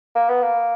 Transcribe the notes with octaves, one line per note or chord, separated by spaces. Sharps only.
A#3
B3
A#3